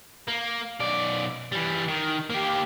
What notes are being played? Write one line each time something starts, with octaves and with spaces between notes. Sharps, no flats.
A#3
B1 D5
E3 G3
D#3
A#3 G4